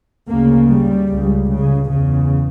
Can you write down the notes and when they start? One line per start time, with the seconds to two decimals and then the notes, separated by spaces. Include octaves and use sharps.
0.28 D2 C#3 A#3
0.69 G3
1.09 C#2 C#3
1.50 C#3
1.90 E2 C#3